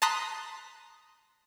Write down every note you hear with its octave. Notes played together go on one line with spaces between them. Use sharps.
A5 A#5 C6 D#6 F#6 B6